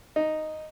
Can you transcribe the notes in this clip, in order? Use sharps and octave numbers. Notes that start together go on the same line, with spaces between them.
D#4